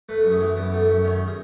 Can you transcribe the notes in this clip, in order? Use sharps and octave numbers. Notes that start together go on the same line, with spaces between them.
A3 B4
F#2
G#4
E3
F#2 B3
A3
F#2
D#3 C#4
G#4